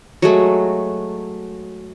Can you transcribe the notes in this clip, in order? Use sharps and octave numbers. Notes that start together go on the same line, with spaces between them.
F#3 G#3 A3